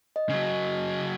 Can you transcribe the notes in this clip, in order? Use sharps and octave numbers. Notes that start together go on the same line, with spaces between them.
D#5
C#3 F#3